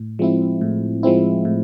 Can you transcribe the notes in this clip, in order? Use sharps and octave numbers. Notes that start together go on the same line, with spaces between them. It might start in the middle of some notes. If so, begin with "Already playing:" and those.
Already playing: A2
F3 G#3 C4 E4
A2
F3 G#3 C4 E4
A2